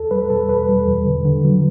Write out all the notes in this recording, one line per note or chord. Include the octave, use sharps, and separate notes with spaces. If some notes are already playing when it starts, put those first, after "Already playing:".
Already playing: E2 A4
G3 B4
B2 A4
E2 B4
G3
E2
D3
D3
F#3